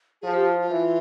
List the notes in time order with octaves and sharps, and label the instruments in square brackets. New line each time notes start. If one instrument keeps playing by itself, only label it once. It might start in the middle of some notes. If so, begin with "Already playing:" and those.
[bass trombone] F3 [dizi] G#4
[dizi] G4
F4
F4
[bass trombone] E3